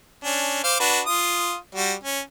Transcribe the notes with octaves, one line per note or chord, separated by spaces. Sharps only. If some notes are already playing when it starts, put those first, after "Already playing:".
C#4 D4
C5 F5 D6
D4 F#4 B4
F4 D#6
G3 F#4
C#4